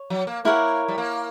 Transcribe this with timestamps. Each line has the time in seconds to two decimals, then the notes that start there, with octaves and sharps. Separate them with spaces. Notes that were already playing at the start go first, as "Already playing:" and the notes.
Already playing: C#5
0.10 F#3
0.27 A#3
0.45 A#3 E4 A#4 C#5 F#5
0.88 G3
0.98 A#3